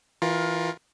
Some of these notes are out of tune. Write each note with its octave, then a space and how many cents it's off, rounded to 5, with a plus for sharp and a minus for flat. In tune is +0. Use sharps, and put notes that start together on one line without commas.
E3 +0 F4 +20 A#4 +15